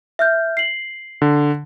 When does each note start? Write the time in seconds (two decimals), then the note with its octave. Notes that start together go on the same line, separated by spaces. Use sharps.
0.19 E5 F6 G6
0.57 C7 F#7
1.22 D3